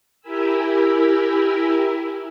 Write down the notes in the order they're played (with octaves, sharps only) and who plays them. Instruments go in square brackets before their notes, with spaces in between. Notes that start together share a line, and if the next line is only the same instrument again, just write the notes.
[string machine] E4 G4 A#4 G#5 B5 E6